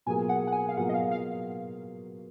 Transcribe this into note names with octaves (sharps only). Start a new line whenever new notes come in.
B2 F#3 A#3 F4 G#4 G#5
F#5
F#5
G#5
F5
B2 F#3 A#3 F4 G#4 F#5
D#5
F5
F5